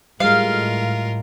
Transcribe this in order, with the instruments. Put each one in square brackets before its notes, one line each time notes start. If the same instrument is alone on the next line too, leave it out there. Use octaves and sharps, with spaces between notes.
[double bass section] A2 [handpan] G3 G#3 [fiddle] F4 A#4 [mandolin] F5